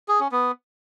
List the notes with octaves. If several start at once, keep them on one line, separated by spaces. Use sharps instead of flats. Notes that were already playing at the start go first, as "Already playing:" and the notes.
G#4
C#4
B3